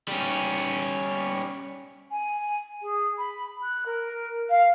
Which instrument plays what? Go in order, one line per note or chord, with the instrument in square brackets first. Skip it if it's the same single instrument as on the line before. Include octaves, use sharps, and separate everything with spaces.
[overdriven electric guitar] G3 C#4
[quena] G#5
G#4
B5
F#6
A#4
F5